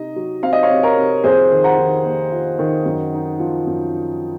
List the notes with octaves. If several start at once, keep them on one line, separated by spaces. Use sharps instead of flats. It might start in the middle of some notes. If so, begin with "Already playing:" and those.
Already playing: C3 D#4 D#5
F#3
C4 F5
D#5
C#5 F5
C3
A#4 C#5
C3
F2 G#4 C5
D#3
F#5 A#5
D#3
A#3
F4
D#3
F#2
D#4
F3
F#2